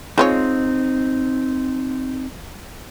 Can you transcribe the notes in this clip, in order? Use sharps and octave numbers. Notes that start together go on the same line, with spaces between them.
G#3 C4 D#4 F4 C#5